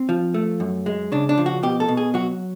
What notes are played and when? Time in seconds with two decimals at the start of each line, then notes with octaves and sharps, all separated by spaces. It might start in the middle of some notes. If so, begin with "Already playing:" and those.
Already playing: C4
0.09 F3
0.34 A3
0.60 F#2
0.86 G#3
1.12 C#3 D4
1.29 D4
1.38 F3
1.46 F#4
1.63 B2 G4
1.80 A4
1.88 B2
1.97 G#4
2.14 F#3 F#4